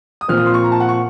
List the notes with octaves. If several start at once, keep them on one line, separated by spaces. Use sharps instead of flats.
D#6
A#2 F3 C4 F6
D#6
C6
C#6
A#5
A5
F#5
C#6